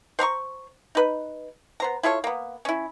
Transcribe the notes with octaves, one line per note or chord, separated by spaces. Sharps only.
C5 A#5 C6 C#6
D#4 B4
B3 C5 A#5
E4 F4 A4 C#5
A#3 B3
C#4 E4